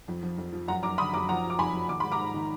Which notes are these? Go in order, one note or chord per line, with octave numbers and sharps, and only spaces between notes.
F2
F3
F2
F3
F#2 F#5 A#5
F#2 A#5 D6
D3 B5 D#6
F#2 A#5 D6
F3 F#5 A#5
F3
D6
F2 G#5 B5
F3
D#3 D6
G#2 B5
A#5 D6
G#2
D#3